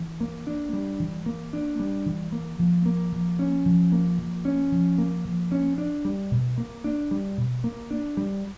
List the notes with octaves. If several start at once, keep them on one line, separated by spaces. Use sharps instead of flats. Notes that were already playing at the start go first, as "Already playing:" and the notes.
Already playing: E3
A#3
D4
G3
E3
A#3
D4
G3
E3
A#3
F3
A#3
F3
C#4
F3
A#3
F3
C#4
F3
A#3
F3
C#4
D4
G3
B2
A#3
D4
G3
B2
A#3
D4
G3